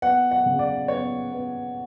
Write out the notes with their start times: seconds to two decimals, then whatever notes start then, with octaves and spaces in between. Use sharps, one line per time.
0.02 B3 F#5
0.31 F#5
0.46 C#3
0.59 D5
0.88 B3 C#5
1.32 B3